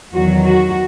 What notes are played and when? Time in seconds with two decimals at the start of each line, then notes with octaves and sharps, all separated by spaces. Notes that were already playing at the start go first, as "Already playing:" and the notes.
0.12 E2 D#3 F#3 F#4
0.44 F#4